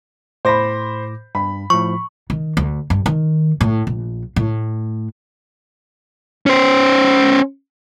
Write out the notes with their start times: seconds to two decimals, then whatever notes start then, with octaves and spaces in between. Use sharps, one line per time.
0.45 A2 C5 B5 D6 A#6
1.35 G2 B5
1.70 A2 F3 C#6
2.30 D#3
2.57 D2
2.90 G2
3.06 D#3
3.61 A2
3.87 A#1
4.36 A2
6.46 C#4 C5